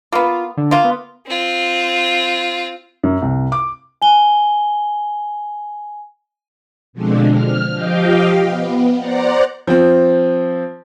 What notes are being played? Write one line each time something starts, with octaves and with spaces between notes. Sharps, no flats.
A#3 B3 F4
D3
A#3 F4
B3
C4 F4
F#2
C2
D6
G#5 G7
B2 D3 F3 G#3 C4 D4
F6
F3 G4 D#5 F5 G5
B3
C5 D5 F#5 A#5
F3 C4